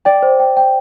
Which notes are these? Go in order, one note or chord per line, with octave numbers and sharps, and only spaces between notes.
D5 G5
C5
G5
G5